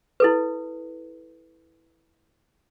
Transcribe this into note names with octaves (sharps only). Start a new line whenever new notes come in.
E4 A4 B4